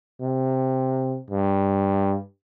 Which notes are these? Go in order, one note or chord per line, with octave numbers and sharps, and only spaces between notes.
C3
G2